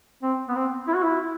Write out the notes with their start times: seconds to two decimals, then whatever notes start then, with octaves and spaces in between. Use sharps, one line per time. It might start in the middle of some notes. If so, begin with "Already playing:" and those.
0.23 C4
0.48 B3
0.55 C4
0.88 E4
0.95 F#4
1.03 E4